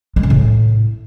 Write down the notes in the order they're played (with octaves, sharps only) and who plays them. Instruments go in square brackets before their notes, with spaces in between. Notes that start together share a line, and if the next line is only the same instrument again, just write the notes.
[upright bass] G#3
C#3
A2